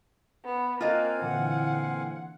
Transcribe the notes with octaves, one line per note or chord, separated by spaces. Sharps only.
B3
A#3 C4 F4 D#5 F5 G#5 F#6
A#2 D3 E3 F#5